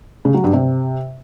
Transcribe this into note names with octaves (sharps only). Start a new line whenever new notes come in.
C#3
F#3
G2
C3